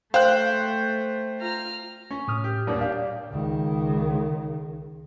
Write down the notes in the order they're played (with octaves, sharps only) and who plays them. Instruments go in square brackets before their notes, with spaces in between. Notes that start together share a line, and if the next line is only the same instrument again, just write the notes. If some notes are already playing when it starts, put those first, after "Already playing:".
[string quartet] A3 [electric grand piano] C5 G5 F#6 [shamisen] F5
[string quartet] F4 A#5 F6
[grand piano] C#4
[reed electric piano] A2 D#6 F6
[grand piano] G4
D#1 A#2 D4
[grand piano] D4 G4 [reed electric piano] F5
[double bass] C#2 D#3